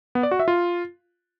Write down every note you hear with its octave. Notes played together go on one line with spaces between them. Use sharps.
B3
D5
F#4
E5
F4